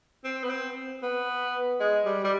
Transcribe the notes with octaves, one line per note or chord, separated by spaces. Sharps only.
C4
B3
C4
B3
G#3
G3
G3